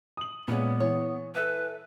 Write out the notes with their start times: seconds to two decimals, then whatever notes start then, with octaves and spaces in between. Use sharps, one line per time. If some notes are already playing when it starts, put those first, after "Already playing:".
0.17 D#6 F#7
0.48 A#2 G#3 B3 C#4 B4
0.80 E3 C#5
1.35 A4 B4 E5 G#5